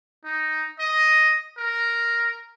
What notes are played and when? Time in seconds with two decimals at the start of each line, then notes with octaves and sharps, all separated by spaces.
0.24 D#4
0.79 D#5
1.57 A#4